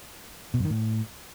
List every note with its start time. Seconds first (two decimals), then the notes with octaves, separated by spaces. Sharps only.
0.54 B2
0.59 F#2
0.65 D#3
0.70 A2